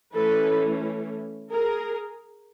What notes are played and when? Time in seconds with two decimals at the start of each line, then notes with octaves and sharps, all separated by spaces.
0.14 E3 A3 C#4 A4 B4
1.52 G#4 A#4